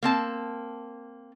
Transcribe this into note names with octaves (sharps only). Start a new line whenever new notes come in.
A#3 C4 A5